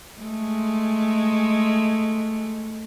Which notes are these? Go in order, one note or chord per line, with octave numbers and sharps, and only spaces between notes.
G#3 A3